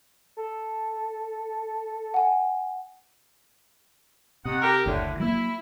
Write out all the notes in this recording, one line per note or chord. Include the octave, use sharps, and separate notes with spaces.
A4
F#5 G#5
D#2 C3 D#5 F#5
G4 A4 A#4
F#1 D2 A2 D3
F#3 A#3 E4